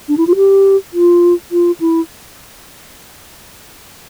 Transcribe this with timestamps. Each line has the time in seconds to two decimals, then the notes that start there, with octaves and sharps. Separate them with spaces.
0.08 D4
0.18 E4
0.27 F4
0.36 G4
0.93 F4
1.52 F4
1.80 E4